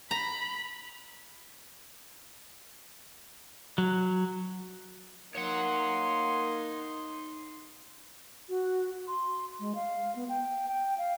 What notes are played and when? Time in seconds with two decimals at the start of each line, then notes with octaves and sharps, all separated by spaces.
0.11 A#5 B5
3.78 F#3
5.35 A#3 D#4 C#5 F#5 C6
8.49 F#4
9.08 C6
9.60 G#3
9.75 F5
10.16 B3
10.29 G5
10.69 G5
10.98 F5